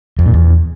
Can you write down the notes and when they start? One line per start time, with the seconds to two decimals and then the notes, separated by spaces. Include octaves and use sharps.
0.19 F2
0.26 A#2
0.33 E2